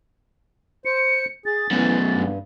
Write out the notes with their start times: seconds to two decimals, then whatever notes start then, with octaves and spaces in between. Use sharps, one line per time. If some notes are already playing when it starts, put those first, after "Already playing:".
0.85 C5 C#7
1.46 G#4 A6
1.71 F#2 B2 E3
2.11 G2